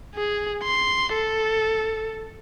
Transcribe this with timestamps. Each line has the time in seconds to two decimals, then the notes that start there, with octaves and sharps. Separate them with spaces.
0.15 G#4
0.64 C6
1.13 A4